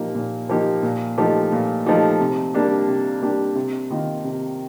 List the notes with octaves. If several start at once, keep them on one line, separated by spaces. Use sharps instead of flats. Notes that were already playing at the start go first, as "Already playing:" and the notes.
Already playing: A#2 F3 A#3 D#4 G4
A#2
F3 A#3 D#4 G4
A#2
F3 A3 D#4 G4
A#2
F3 A3 D#4 G4
C3
G3 A#3 D4 G4
C3
G3 A#3 D4 G4
C3
D#3 A#3 F4
C3